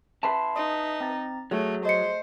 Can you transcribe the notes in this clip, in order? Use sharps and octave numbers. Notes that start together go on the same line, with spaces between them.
B4 E5 A5 B5 C6 C7
D#4 D#6
C4 A#5 A6
F#3 A3 G#4
C5 D#5 C#7